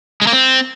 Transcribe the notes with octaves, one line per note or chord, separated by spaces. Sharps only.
G#3
A#3
C4